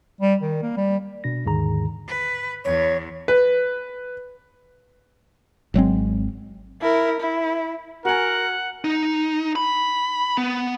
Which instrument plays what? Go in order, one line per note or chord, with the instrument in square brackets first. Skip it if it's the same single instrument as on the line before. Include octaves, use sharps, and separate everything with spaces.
[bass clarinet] G3
D#3
A#3
G3
[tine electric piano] B2 D4 A#6
D#2 G#2 D3 D#3 G#4 A#5
[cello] B4
[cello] E2 [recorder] C#5
[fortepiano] B4
[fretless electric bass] G#1 F#3 G#3 C4
[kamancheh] E4 A#4
E4
[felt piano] F#4 G#5 [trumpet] A#4 [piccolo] F#5
[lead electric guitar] D#4
B5
B3